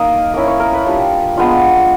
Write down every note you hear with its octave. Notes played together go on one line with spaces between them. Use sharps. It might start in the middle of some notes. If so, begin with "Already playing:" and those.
Already playing: A#3 D#4 D#5
A#3 C#4 E4
C#5
A#4
B4
G3 A#3 D4 F4
G#3 B3 D4 F4